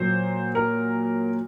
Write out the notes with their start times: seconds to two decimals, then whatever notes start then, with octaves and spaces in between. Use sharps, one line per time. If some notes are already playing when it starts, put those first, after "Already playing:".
Already playing: A#2 F#3 C5
0.55 A#4